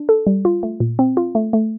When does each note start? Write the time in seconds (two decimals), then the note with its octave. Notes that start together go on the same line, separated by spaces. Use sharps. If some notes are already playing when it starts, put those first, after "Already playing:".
Already playing: D4
0.09 A4
0.27 G3
0.45 F4
0.63 A3
0.80 A#2
0.99 C4
1.17 F4
1.35 A3
1.53 A3